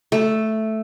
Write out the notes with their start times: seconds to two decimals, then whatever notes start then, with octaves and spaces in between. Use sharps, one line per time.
0.12 A3